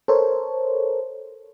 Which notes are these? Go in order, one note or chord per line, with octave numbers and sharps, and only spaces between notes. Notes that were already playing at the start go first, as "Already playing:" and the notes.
A4 A#4 C5 C#5